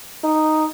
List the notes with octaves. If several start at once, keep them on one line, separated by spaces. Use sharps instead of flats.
D#4